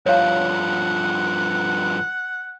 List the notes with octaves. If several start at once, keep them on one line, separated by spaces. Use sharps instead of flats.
G2 F3 C#5 F5 F#5